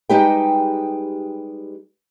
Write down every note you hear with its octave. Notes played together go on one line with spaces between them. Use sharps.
G3 G#3 D#4 G4 B4 G5